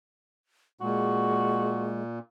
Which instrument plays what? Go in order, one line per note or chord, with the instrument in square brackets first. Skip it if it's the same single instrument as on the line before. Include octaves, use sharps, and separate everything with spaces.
[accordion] A#2 [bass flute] G#3 [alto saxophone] F#4